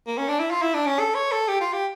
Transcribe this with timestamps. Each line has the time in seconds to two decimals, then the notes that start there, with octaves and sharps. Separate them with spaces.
0.07 A#3
0.18 C#4
0.29 D4
0.39 E4
0.50 F4
0.62 E4
0.74 D4
0.86 C#4
0.99 A4
1.15 C#5
1.32 A4
1.48 G4
1.61 F4
1.73 G4